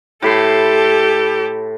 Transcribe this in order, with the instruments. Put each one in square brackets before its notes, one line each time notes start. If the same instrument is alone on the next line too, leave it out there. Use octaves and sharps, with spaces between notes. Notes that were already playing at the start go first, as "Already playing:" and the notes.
[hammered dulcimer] A2 B5 C6 [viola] G4 A4